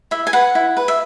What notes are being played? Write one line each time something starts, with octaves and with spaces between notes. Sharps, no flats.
E4 E5
G#5
B4 F#5
E4
B4
E5